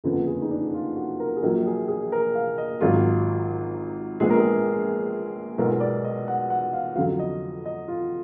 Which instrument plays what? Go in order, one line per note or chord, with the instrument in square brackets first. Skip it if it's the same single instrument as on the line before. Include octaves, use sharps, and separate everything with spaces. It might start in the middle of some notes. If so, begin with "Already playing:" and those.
[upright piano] F#1 F2 D3 F3 B3
[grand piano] G#4
D#4
D4
F4
F#4
A#4
G#4
[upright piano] A#1 A#2 F#3 [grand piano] A#4
[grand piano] G#4
G#4
A#4
F5
D#5
[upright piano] G#1 G#2 F#3 [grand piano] F4
[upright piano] A#1 A#2 G#3 B3 D4 [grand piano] G#4
[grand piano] A#4
G#4
[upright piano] B1 B2 G#3 B3 F4 [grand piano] A#4
[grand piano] D5
D#5
F#5
F#5
F5
[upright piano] F2 D3 F#3 [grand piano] F5
[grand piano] D#5
D#5
F4